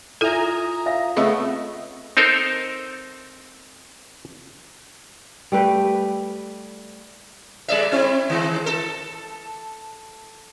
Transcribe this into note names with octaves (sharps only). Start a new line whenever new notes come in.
E4 F4 A4 E5 G#5 A#5 D#6 F6
E5 F5 A#6
C#3 A3 B3 C4 D#5 E6
C4 D#4 A4 A#4 C5
G3 A3 B4 G5
G3 D5 E5
C4 E4
D#3 G#3
A4